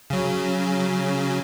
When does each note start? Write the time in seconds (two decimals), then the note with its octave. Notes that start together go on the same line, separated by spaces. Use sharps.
0.10 C#3 F#3